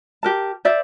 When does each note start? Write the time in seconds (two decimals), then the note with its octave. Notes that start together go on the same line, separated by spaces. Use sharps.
0.23 G4 A#4 A5
0.65 C5 D5 E5